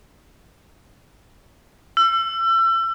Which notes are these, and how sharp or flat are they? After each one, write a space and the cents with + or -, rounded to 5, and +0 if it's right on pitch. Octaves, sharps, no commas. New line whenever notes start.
E6 +35